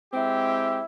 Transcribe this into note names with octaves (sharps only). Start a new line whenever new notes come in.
G#3 C4 E4 G4